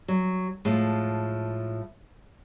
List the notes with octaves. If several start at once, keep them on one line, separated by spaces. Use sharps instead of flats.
F#3
A2 F3 G#3